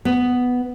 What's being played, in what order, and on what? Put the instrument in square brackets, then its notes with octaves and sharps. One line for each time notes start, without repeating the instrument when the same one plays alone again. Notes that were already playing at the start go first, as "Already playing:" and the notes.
[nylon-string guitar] B3